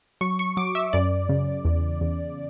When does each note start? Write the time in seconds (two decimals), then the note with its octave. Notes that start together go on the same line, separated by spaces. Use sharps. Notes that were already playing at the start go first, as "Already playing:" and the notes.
0.21 F#3 C#6
0.39 C#6
0.57 F#3 D6
0.75 E5
0.93 F#2 D5
1.29 C#3
1.65 E2
2.01 E2